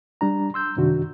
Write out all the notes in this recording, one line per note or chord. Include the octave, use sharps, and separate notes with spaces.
G3 D4 A#5
C6 E6 G6
F#2 C3 D#3 D4 F#4